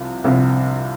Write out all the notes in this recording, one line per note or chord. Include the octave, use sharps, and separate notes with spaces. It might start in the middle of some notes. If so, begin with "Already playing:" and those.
Already playing: C2 C3 F3 F4
C2 C3 F3 C4 F4